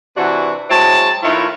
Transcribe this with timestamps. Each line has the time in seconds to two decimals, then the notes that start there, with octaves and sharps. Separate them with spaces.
0.17 C3 E3 D4 F#4
0.70 F#3 G#3 C4 E4 C#5 A5
1.23 D#3 A3 E4 F4 B4 C#5